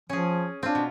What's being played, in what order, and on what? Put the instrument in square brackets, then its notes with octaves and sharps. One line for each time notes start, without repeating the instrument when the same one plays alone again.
[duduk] F3 [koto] C#4 G#4
[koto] C4 F4 [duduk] D4
[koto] B2